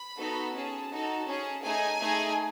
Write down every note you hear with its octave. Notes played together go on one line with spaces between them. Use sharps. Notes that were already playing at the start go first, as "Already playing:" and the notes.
Already playing: B5
B3 D#4 F#4 A4
C#4 G#4 A5
D#4 F#4 A4
C#4 G#4
A3 D#4 G#4 G#5
A3 D#4 G#4